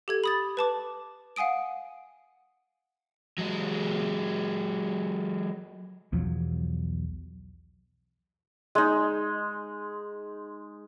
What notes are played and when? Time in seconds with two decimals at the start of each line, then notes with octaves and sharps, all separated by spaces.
0.08 G4 A4 G#6
0.24 B5 D#6 A6
0.57 B4 A5 D6
1.36 F5 F#5 G#5 D#6 D7
3.38 F#3 G#3
6.13 B1 E2 F3 F#3
8.75 G#3 D#4